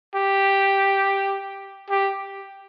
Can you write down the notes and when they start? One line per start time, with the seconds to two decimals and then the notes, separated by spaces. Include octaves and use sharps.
0.16 G4
1.90 G4